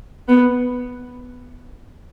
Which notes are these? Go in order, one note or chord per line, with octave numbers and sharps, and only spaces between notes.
B3